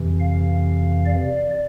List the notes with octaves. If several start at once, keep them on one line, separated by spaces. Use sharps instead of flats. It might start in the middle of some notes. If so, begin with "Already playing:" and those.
Already playing: F2 C3 E3
F5
D5